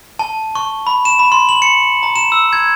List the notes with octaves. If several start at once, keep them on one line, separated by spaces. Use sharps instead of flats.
A5
C#6
B5
E7
B5
C6
F#7
C#7
A#5
E7
E6
G#6